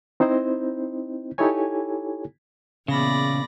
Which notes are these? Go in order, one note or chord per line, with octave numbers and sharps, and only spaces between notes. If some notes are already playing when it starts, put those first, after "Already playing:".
C4 D#4 E4 C5 D#5
D#4 E4 G4 A4 C#5 G#5
E2 A#2 C#3 D5 B5 A#6